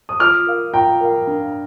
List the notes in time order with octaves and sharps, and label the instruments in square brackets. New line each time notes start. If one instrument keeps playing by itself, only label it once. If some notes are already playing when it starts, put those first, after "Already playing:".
[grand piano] D#6
[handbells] F4 [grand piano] D6 F6
[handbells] A#4 F5
[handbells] F4 [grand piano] G5 A#5
[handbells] A#4 F5
D4